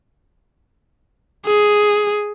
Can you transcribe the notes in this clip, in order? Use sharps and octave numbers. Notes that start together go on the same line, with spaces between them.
G#4